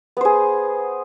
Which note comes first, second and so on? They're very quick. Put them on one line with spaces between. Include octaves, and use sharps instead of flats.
B3 C5 G#4